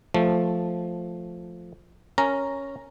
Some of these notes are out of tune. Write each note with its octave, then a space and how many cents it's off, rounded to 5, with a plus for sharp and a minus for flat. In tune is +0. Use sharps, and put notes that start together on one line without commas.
F3 +0 A3 +0
C#4 +0 A#4 -5 A#5 +0